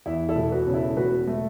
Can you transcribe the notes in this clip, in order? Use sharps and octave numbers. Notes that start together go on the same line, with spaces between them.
E2 E4
E4 A4
E1
F#4 B4
C#3
E4 A4
E1 F#4 B4
A3